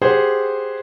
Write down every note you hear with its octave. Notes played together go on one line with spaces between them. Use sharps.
G4 G#4 C5 F#5